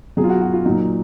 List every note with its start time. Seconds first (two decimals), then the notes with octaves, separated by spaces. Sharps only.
0.17 B2 F#3 G#4
0.24 F4
0.29 F#4
0.41 F#4
0.53 F4
0.65 A#2 F#3 D#4